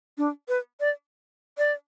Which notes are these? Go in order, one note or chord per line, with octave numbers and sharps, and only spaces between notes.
D4
B4
D5
D5